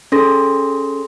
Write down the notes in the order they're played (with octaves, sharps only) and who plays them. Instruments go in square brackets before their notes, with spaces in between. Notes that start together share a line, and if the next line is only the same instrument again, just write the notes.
[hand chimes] C#4 G#4 A4 C6 A#6